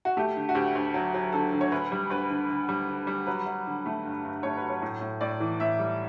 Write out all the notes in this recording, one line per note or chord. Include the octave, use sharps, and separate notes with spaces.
F#4
A3 G4
D3
F#4
D2 G4
D2
F#3
F#3
D3 A4
D3
C#5
D2 B4
G3
D2 B4
D3
D3
G3
D3
G3
F#3 B4
F#3
D3
A3
G2
G2
A3 C#5
B4
F#3
C#5
A2
A2
A2 D5
E3
A2 E5
G3